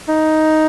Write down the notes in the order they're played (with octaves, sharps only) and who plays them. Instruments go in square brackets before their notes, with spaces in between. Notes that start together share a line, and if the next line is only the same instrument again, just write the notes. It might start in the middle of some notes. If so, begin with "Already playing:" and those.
[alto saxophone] D#4